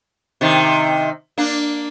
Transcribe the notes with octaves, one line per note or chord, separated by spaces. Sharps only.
C3 D#3
A#3 D4